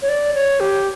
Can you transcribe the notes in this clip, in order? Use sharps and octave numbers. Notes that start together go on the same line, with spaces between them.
C#5
D5
C#5
G4